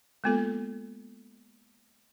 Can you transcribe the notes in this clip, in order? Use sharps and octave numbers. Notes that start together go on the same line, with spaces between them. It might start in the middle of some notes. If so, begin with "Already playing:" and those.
G#3 A#3 B3 F4 A4